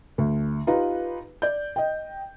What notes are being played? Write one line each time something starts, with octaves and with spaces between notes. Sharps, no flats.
D2
D#4 F4 G4 B4
D5 G6
D#5 G5